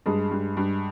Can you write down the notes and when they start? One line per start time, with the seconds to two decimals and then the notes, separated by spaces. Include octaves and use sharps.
0.06 G2 G#3 G#4
0.31 G2
0.57 G2